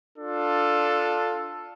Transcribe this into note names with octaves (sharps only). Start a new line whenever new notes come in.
D4 F4 A4